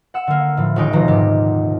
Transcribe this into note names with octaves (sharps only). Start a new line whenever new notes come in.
F#5 E6
D3 A#3
A2 F3
D#1 G#3 D#4 G5 D7
D#1 B2 F3 A#5
G#2 C3 G4